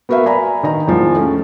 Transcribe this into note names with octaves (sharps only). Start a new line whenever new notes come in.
B3 F#4 A#4 B4 E5 F5
D5 G#5 A#5 B5
D#3 D#5 A#5
E2 D#3 F3 G#3
A3 C#4